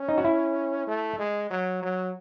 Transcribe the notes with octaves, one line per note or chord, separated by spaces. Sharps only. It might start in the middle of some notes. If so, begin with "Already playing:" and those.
Already playing: C#4
D#4
F#4
E4
A3
G#3
F#3
F#3